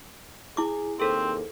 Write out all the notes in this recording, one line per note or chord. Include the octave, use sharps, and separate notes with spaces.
E4 G#4 D6
D#2 C4 G#4 A4 C5